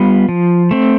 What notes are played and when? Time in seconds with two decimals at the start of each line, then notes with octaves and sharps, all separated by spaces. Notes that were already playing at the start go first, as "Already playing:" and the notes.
Already playing: G3 B3 F4
0.29 F3
0.71 A3 C4